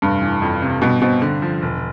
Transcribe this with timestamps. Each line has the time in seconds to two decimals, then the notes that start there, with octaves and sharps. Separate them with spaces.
0.02 F1 G2
0.22 E3
0.42 F2
0.62 C3
0.82 G2 B2
1.02 B2 C4
1.22 D3
1.42 F3
1.62 E1